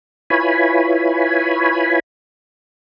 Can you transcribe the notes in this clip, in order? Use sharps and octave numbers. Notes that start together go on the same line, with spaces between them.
E4 F4 B4 C#5 G#5 B5